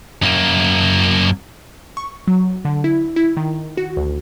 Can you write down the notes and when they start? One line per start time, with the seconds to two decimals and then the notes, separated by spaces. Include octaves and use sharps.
0.22 F#2 A#3
1.97 C#6
2.27 F#3
2.65 D3
2.84 E4
3.16 E4
3.37 D#3
3.77 F#4
3.97 D2